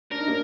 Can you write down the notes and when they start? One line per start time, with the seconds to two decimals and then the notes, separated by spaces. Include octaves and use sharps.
0.11 D4 A#4
0.20 D#4
0.28 A#3 D4